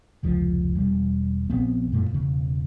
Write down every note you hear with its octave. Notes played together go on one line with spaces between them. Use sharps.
F1 C#2 F3
E1 G3
A#1 B3 C4
F#2 A#2 A3
E1 C#3